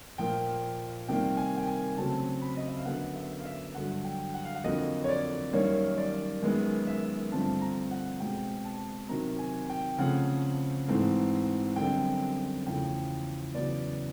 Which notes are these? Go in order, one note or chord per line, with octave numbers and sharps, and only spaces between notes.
A#2 F3 A#3 G5
C3 D#3 G3 A#3 G5
G#5
G5
G#5
C#3 F#3 A3 C4 A5
B5
D#5
E5
F5
F#2 D3 F#3 B3 F#5
E5
F5
E5
G2 D3 F#3 F#5
G5
F#5
F5
F#5
F2 D3 F#3 A#3 D#5
C#5
D5
F#2 D#3 G3 A#3 C#5
D5
F#2 D#3 G#3 B3
E5
G2 D3 F3 A3 C4 A5
A#5
F#5
B2 G#3 C4 G5
A5
C3 D#3 F#3 A#5
G#5
G5
C#3 F3 A3 C4 F#5
G#2 E3 A3 C4
F#2 D3 G3 C4 G5
E2 C#3 F3 A3 G5
E2 C#3 F#3 B3 D5